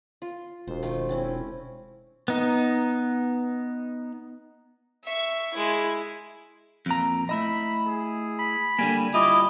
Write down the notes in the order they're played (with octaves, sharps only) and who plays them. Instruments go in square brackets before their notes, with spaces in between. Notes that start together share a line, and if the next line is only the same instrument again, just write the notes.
[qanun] F4
[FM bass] E1 [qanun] C5
[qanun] D#3 F3 A3
C4 C#4 E4
[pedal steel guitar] B3 D#4
[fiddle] E5 C#6
G#3 E4
[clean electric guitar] F2 A#2 A#5
[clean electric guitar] A3 E4 D#5 [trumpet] B5
[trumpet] G#4
[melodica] B5
[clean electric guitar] D3 G3 A#3 [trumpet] G#5
[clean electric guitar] G3 F4 [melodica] E4 D#5 [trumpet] D6